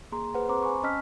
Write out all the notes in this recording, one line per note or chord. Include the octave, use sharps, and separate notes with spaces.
A#3 G#4 A#5 C6
G#4 B4 C5 F#5
C4 C5 A#5 C6 D6
G#5 B5 C#6
C#4 D#5 A5 E6 F6 B6